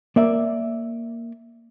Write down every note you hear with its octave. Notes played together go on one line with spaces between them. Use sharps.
A#3 D5 E5